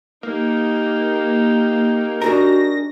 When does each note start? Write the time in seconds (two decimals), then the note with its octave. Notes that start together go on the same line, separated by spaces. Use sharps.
0.23 A#3 D#4 G4
2.22 D4 F#4 G#4 A#4 A#6